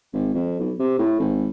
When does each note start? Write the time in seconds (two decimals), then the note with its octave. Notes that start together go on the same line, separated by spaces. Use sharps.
0.14 G#1
0.34 F2
0.60 B1
0.79 C3
0.99 A2
1.20 G#1